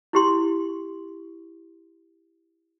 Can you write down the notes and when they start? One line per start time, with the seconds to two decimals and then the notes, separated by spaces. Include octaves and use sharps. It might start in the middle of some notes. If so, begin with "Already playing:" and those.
0.13 E4 G4 C6